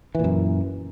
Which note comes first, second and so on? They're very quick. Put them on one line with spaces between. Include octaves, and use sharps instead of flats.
E3 A#2 F#2